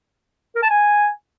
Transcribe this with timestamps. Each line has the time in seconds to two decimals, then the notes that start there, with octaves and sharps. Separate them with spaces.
0.55 A#4
0.63 A5
0.70 G#5